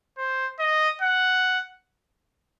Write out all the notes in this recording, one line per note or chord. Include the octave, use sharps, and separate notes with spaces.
C5
D#5
F#5